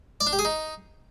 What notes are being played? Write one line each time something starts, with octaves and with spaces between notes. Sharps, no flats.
D5
D4
G4
G#4
D#4